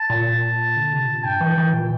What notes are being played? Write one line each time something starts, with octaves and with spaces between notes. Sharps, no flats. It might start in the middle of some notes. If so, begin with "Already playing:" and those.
Already playing: A5
A#2
D3
C3
A#2
G2 G5
E3
E3
A#2